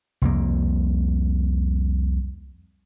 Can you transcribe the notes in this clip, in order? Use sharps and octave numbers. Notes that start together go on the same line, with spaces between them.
C2 F2 A#3